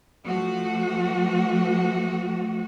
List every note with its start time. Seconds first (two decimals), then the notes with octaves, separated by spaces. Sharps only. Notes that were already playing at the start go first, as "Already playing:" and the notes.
0.24 F3 A3 F#4